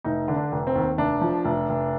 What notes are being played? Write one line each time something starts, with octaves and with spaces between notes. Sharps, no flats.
F1 D#4
D3
D4
F1
C4
D#2
F1 D4
F3
F1
F1